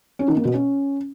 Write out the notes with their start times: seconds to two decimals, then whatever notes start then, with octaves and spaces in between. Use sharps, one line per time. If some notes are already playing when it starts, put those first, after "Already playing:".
0.19 C#4
0.28 D#3
0.36 A#3
0.45 B2
0.53 C#4